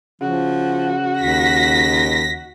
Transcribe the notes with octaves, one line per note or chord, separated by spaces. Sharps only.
C#3 F3 F#4
D#2 A#6 B6